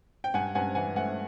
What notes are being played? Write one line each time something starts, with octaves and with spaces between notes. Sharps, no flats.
G5
G2 F#5 G#5
G2 F#5 G#5
E3 F#5 G#5
A3 F#5 G#5